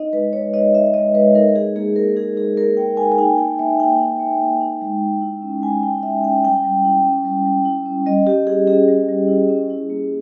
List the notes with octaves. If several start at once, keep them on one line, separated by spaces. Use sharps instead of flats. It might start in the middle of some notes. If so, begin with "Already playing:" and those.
Already playing: D#4 D#5
G#3 B4
G#3 C#5
D#4 D#5
D#4 E5
G#3 D#5
G#3 B4
D#4 A#4
D#4 G#4
A#3 G#4
A#3 A#4
D#4 G#4
D#4 G#4
A#3 A#4
A#3 G5
D#4 G#5
G#5
D#4 G5
A#3 G5
A#3 E5
D#4 G5
D#4
A#3
A#3
D#4
G#3
G#3
E4
C#4
G#3 G#5
G#3 G5
E4 E5
C#4 G5
G3 G5
G3
E4
C#4
G3
G3
E4
C#4
G3 D#5
G3 G4
E4 G#4
C#4 G#4
G3
G3
E4
C#4
E4
A#3